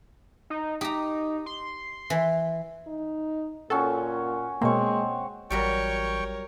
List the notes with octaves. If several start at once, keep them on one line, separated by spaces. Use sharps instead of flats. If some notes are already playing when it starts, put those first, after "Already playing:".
D#4
D#4 G4 A#5
C6
E3
D#4
A#2 C#4 F#4 A4 G5
B2 G#3 A#3 C4 C#5
A1 F#3 G3 A#4 C#5 D5 G5 C#6